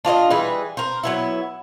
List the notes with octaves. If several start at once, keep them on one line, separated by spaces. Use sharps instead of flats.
D4 F4 D5 D#5
E3 G3 G#4 B4
A#4 C5
F#3 B3 E4